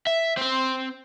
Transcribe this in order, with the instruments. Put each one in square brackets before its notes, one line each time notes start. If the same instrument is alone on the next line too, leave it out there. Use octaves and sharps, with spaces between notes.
[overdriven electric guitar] E5
C4 C5